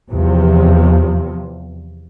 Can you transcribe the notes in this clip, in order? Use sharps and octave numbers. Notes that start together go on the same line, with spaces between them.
E2 C3 F3